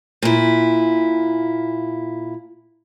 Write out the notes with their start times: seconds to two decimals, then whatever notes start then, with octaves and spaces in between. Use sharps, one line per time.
0.22 A#2 E4